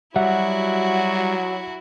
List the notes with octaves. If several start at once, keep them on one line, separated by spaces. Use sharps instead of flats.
F#3 G3 E4 F#4 E5 F#5